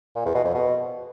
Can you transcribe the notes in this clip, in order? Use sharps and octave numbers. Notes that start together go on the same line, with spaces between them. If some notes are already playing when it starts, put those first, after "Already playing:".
A#2
E2
B2
F2
B2